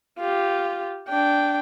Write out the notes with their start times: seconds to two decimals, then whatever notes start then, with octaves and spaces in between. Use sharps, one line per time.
0.19 F4 G4
1.08 D4 G5